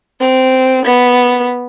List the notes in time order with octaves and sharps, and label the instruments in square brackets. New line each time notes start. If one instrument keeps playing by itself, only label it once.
[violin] C4
B3